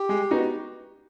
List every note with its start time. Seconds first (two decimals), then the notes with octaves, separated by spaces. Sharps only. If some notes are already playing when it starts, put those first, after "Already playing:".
Already playing: G4
0.09 G#3
0.31 B3 D#4 F#4